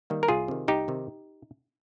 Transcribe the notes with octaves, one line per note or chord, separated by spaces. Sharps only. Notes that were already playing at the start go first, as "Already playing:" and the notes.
D#3 G3 A#3
A#4
C2 F4 G#4
C3 D#3
C2 D#4 G4
C3 D#3